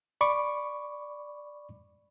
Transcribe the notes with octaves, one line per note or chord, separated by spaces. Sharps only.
D5 B5 C#6 D6